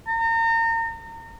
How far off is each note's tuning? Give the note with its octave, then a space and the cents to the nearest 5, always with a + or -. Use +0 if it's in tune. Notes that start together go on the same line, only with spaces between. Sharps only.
A#5 -35